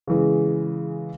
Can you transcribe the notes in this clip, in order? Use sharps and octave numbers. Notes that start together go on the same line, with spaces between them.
C#3 E3 G#3